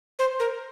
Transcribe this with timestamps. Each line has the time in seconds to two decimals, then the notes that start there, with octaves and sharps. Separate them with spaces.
0.19 C5
0.40 A#4